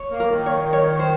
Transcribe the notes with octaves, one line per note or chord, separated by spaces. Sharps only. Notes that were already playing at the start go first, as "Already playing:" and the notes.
Already playing: C#5
A#3
A#4
D#3
C#5
C#5
C5